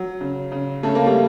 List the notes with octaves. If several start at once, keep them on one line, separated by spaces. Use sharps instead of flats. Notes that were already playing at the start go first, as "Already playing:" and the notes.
Already playing: F#3
C#3
C#3
C#3 A3
A#3
G3 A3